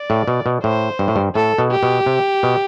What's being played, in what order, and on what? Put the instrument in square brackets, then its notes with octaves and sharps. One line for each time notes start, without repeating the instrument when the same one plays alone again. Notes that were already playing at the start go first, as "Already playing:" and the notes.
Already playing: [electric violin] D5
[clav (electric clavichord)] A2
B2
B2
[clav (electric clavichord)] A2 [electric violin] C5
[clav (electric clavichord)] G2
A2
G2
[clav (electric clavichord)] A2 [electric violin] A4
[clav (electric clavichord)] B2
[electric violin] G4
[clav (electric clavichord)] B2
C3
B2